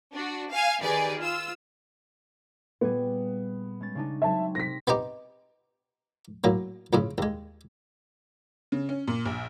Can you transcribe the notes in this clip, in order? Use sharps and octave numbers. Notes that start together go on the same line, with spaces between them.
D4 F#4
F5 G#5
D#3 G4 G#4 B4 D5
F4 E6
A#2 G3 B3 G#4
G#3 C#4 A6
C#3 D4 D#4
F#3 C4 C#5 E5 A5
C3 C4 A#6 B6
B3 C4 D#4 G4
A2 F#3 A#3
F2 A2 C#3
D#2 G#3
C#3
C#4
A#2
A#1